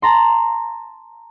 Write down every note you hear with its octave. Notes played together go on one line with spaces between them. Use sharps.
A5 A#5 C6